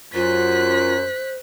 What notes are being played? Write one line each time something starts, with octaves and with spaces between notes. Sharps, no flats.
F#2 F4 C5 F#6 B6